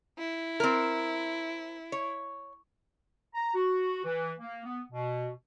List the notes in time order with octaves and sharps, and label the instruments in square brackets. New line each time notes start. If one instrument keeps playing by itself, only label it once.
[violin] E4
[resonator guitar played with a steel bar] C4 A#4
C#5
[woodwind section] A#5
F#4
E3
A#3
B3
B2